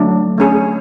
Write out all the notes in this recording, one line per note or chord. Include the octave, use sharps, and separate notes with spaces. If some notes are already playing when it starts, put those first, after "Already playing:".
Already playing: D3 F#3 A3 D4
A3 C#4 G#4